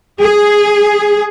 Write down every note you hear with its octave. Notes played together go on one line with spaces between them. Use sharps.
G#4